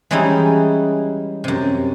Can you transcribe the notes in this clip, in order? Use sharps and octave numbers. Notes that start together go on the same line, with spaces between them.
E3 G3 G#3 C#4 D#4 E4
F#2 C3